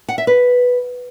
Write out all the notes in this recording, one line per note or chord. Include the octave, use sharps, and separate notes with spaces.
F#5
E5
B4